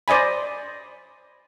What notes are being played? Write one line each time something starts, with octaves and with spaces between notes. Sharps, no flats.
C5 D5 D#5 G#5 B5